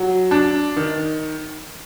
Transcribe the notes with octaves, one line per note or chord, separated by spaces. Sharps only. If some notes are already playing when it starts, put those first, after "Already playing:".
Already playing: F#3
D4
D#3